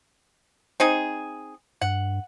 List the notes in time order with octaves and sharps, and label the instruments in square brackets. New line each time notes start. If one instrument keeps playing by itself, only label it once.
[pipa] C4 D#4 G#4
[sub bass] G2 [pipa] F#5